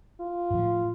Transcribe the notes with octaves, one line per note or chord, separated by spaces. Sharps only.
F4
A2 F3